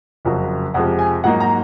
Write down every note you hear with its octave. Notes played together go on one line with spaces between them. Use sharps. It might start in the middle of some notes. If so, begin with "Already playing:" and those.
F#1 F2 C#3 F#3
F2 C3 F3 G#3 F#5
G#5
G#2 F#3 A#3 D#4 F#5
A#5